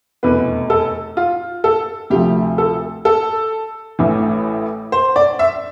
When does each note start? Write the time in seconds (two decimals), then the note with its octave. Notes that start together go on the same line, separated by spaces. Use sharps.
0.23 F1 E2 B2 B4
0.70 A4
1.17 F4
1.64 A4
2.10 D2 C3 F3 G4
2.58 A4
3.05 A4
3.99 A1 A2 E3
4.92 C5
5.16 D5
5.39 E5